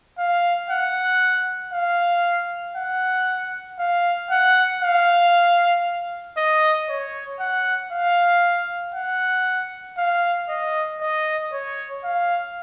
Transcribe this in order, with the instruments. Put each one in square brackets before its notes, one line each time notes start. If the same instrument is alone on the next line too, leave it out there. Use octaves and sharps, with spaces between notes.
[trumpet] F5
F#5
F5
F#5
F5
F#5
F5
D#5
C#5
F#5
F5
F#5
F5
D#5
D#5
C#5
F5